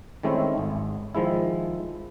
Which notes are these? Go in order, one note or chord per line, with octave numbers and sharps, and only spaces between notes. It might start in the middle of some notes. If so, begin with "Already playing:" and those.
D#3 G#3 A3 C4 C#4 E4
G#1
D#3 F3 G#3 E4